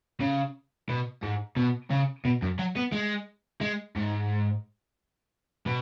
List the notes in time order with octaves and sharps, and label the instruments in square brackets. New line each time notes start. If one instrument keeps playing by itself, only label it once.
[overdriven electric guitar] C#3
B2
G#2
B2
C#3
B2
F#2
F#3
B3
G#3
G#3
G#2
B2